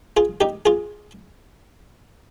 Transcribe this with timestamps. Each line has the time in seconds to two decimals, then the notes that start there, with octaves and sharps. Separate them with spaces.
0.17 F4 G#4
0.41 D#4 G4
0.66 F4 G#4